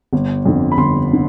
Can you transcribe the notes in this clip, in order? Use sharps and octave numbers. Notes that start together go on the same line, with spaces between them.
G1
F2 D3
B5
G1 C6
D3